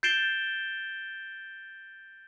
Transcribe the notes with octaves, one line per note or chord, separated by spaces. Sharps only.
G6 A6 C7 D7 E7 G7